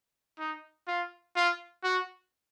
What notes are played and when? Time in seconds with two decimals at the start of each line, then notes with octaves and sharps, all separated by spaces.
0.39 D#4
0.88 F4
1.36 F4
1.84 F#4